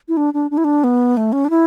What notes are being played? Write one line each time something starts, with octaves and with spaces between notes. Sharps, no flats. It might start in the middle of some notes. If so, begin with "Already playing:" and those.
E4
D4
D4
D4
E4
D4
B3
A3
C#4
D4
E4